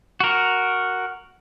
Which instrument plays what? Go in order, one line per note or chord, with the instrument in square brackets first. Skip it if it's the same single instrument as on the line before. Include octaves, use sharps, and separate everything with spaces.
[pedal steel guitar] F#4 A#4